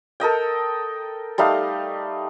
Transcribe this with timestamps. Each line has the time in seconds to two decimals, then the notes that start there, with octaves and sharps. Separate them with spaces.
0.20 A4 A#4 D#5 G5
1.38 G3 A3 D#4 F5